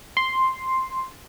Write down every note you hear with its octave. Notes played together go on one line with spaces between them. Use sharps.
C6